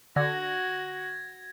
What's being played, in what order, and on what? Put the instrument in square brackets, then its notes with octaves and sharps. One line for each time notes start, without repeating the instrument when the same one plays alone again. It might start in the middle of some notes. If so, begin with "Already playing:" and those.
[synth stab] D3 [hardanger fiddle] F#4 [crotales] G#6 A#6